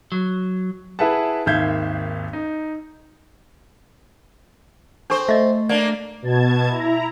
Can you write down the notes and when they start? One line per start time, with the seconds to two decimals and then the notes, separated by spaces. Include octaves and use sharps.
0.12 F#3
0.99 E4 G#4 B4 E5 F#5 A5
1.46 G#1 D#2 E5 F5 G6 G#6
2.33 D#4
5.10 C4 D4 A4 C5 C#6
5.29 A3 D#5 E5
5.69 A#3 D4 D5
6.22 B2 A5 G#6
6.69 E4 A#5